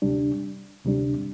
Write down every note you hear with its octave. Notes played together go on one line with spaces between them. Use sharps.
D2 C3 G3 D4
D2 C3 G3 D4